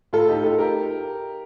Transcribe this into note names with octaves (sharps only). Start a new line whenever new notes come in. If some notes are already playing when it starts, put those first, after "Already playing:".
A2 F4 A4
D#4 G4
A3 D#4 F4 A4
G4 A#4